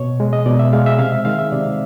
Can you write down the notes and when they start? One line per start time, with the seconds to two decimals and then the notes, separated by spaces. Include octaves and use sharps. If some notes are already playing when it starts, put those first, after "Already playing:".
Already playing: B2 C#5
0.20 G#3
0.33 D#5
0.46 B2 D5
0.59 E5
0.73 G#3 F5
0.86 E5
0.99 C3 F5
1.12 E5
1.25 D#3 G#3 F5
1.39 E5
1.52 C3 D5